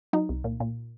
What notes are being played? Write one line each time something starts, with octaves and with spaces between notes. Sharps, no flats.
F#3 D#4
C2
A#2
A#2